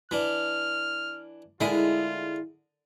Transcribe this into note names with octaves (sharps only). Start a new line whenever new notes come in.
E3 D4 F6
D3 G#3 E4 F4 A#4 D#6